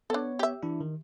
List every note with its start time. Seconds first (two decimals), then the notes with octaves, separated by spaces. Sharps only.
0.10 B3 D4 A4 C#5
0.39 G4 E5
0.63 E3 D4 E4
0.81 D#3